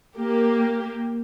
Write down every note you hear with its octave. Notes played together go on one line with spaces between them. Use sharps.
A#3 G4